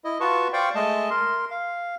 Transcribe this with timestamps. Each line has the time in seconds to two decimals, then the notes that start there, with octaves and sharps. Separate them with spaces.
0.04 E4 D#5
0.20 F4 F#4 B4 A5 C#6
0.53 C5 D5 F5 G5 C#6
0.75 G#3 A3 D#5 A5
1.10 A#4 C6
1.51 F5